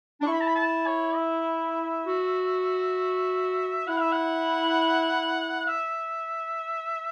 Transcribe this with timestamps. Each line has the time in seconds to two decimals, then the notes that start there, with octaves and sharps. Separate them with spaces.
0.21 D4
0.26 E4 C#6
0.33 B5
0.41 A5
0.47 B5
0.56 A5
0.87 C#5
1.16 E5
2.06 F#4
3.87 E4 F#5
4.00 E5
4.12 F#5
5.67 E5